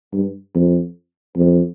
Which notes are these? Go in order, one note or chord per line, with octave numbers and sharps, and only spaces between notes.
G2
F2
F2